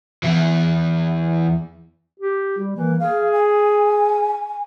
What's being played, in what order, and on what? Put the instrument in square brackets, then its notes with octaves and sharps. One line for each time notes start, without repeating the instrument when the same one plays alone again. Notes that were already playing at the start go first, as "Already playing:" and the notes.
[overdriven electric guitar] E2 E3
[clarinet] G4
G3
[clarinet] E3 [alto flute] A#3
[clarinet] G#4 [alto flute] F5
[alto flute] G#5